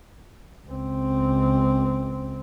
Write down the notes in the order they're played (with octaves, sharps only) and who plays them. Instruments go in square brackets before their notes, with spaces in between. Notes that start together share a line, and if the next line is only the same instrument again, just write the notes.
[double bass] C#2 C4